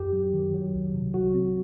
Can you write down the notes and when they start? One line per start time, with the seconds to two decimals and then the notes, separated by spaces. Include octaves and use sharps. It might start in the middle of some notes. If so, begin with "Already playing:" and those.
Already playing: F#2 G4
0.13 F#3
0.34 D#3
0.54 F#3
0.74 C2
0.94 C3
1.14 F#3 F#4
1.34 C4